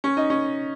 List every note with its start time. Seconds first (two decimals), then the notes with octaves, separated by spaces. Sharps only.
0.04 C#4
0.17 D#4
0.30 C#4